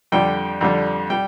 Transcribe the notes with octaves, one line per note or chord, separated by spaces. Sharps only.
F2 D3 G3 G5
F2 D3 G3
G3 G5